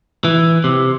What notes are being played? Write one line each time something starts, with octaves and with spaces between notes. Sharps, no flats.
E3
C3